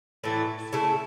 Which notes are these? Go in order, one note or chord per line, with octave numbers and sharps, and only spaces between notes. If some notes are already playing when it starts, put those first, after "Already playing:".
A2 E3 A3
C#3 A3 E4 A4